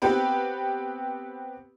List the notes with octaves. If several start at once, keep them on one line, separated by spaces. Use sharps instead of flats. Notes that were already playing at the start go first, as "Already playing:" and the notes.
B3 C4 G4 B4